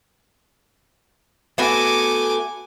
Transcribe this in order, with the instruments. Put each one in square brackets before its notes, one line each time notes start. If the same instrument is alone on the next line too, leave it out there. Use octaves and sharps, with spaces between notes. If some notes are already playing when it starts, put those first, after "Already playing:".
[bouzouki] A3 B3 F#4 [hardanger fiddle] G#5 D6